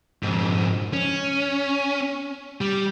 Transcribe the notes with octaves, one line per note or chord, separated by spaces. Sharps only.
F2 G#2
C#4
G3